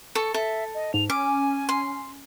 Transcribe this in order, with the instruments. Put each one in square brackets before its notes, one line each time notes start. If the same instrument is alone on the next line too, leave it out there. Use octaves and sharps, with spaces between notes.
[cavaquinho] A4 C#6
[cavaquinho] A4 [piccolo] E5
[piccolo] D#5
[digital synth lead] G#2 [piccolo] F7
[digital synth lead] C#4 [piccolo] G#5 [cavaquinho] D6
[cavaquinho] C6